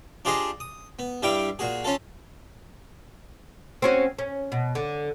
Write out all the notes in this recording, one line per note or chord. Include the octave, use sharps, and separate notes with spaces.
D4 F4 G4 G#4 C5 D#5
D#6
B3
G2 G3 E4 G4 F5 G5
A#2 F#4 G#4
C#4 F4 A4
C4 C#4 F#4
C#4
B2
D3